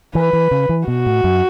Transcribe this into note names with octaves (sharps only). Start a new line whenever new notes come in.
E3 B4
E3
C#3
E3
B2 F#4
A2
F#2